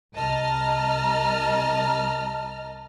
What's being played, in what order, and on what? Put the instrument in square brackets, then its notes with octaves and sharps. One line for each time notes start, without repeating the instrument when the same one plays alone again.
[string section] C2 D#5 A5 A#5 F6